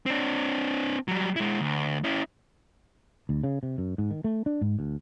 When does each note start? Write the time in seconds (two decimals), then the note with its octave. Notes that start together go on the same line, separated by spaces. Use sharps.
0.06 C4 D4
1.08 F#3 G3
1.36 G#3 E4
1.61 D2
2.04 C#4 E4
3.29 D2
3.44 C#3
3.63 C3
3.78 F#2
3.98 G#2
4.11 D#3
4.24 A3
4.46 D4
4.61 G#2
4.79 D2